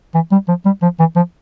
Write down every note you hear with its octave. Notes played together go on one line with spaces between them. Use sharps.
E3
G3
F3
G3
F3
E3
F3